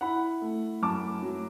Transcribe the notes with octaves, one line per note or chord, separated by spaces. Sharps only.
E4 F#5 B5
A3
F#2 A5 D6
F#3